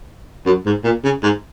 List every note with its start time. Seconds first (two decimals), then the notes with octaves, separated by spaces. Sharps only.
0.46 F#2
0.66 G#2
0.84 A#2
1.04 C#3
1.23 G#2